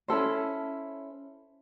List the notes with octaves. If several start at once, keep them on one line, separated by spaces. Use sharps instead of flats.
C#4 E4 A4 C5